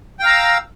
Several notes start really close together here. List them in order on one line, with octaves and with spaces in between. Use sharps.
G5 F5 A#5 E6